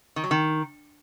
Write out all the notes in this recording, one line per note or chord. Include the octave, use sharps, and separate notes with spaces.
D#3
F#3
D#3